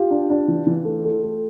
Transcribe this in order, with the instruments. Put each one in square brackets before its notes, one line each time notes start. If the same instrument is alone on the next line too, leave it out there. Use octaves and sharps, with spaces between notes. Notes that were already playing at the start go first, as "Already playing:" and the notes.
Already playing: [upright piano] F4 G4
D4
D4
E3
E3
A3
A3
A3